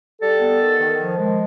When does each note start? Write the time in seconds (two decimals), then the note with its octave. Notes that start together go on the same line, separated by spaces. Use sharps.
0.21 G3 A4
0.40 B3
0.60 D#3
0.79 D#3
0.98 F3
1.17 G#3